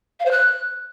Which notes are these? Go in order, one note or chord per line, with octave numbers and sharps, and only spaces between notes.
F5
C5
F#6